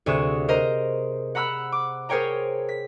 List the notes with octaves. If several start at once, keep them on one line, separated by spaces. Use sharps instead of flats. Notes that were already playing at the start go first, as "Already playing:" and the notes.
D2 C3 G#4 C#6 E7
A#4 C5 D#5 A#5
F#5 A#5 B5 E6 F#6
D6
G#4 A#4 C5 C#5 G5 A#5
B6